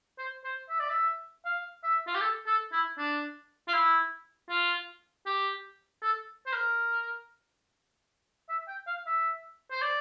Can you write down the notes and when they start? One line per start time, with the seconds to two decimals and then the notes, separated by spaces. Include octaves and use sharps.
0.18 C5
0.44 C5
0.69 E5
0.80 D5
0.90 E5
1.45 F5
1.83 E5
2.07 F4
2.15 G4
2.21 A4
2.47 A4
2.72 E4
2.98 D4
3.68 F4
3.73 E4
4.50 F4
5.26 G4
6.02 A4
6.47 C5
6.53 A#4
8.49 E5
8.68 G5
8.87 F5
9.07 E5
9.71 C5
9.82 D5